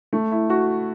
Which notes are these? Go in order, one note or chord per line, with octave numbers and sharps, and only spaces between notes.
A3
E4
F#4